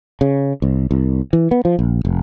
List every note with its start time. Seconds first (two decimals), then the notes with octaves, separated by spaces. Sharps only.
0.21 C#3
0.62 C2
0.91 C2
1.33 E3
1.51 B3
1.65 F3
1.79 A#1
2.05 F1